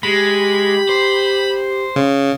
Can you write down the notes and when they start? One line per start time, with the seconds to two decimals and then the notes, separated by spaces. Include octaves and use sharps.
0.03 G#3 G4 B5
0.89 C5
1.96 C#3